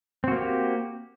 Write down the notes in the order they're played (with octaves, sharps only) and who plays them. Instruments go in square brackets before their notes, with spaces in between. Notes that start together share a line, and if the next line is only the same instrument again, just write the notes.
[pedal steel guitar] C4
F#4
A#3
G4